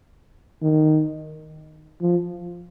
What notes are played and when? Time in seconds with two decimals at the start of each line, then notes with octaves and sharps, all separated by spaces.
0.62 D#3
2.02 F3